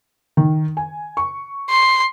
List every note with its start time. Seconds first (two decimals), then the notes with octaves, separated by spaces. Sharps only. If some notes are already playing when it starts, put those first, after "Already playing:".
0.37 D#3
0.77 G#5
1.17 C#6
1.70 C6